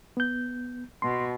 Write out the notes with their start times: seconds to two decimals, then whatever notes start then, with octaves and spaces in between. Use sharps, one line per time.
0.17 B3 G6
1.02 B2 C6